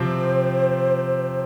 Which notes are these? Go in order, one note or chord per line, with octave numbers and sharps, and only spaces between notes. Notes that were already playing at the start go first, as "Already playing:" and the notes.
Already playing: C3 F3 C4 C5